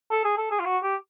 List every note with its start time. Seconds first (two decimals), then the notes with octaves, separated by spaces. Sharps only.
0.11 A4
0.24 G#4
0.37 A4
0.51 G#4
0.60 F4
0.65 F#4
0.83 G4